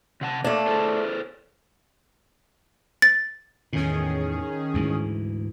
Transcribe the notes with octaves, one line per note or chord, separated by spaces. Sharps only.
C3 F#5 A5
A3 A#3 D4
G#4 A4 C5
A6
E2 A2 D#3 C#4 G#4
D2 G#2 E3